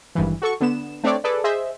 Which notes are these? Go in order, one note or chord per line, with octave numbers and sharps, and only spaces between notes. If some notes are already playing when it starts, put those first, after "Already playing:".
G#1 G2 E3
F#4 A4 C#6
D3 B3 E7
A3 C4 D4 C#5 D5
G#4 A4 B4 D5
G#4 C5 D#5 E5